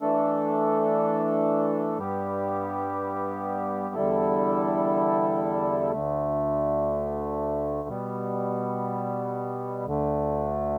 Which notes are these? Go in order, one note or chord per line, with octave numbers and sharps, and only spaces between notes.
E3 A3 D4 A4
G2 G3 B3 G4
E2 D3 G3 E4 A4
D2 D3 A3
B2 G3 B3
D2 D3 A3